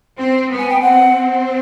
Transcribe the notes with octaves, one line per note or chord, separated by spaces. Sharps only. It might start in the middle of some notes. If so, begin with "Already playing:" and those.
C4
B3
G#5
G5
C4 F#5